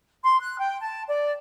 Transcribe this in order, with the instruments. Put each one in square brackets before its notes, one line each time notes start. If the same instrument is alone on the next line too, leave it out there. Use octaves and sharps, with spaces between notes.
[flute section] C6
F#6
G5
A5
D5